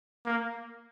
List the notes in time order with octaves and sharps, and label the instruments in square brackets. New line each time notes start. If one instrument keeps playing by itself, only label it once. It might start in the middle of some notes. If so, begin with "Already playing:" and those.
[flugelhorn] A#3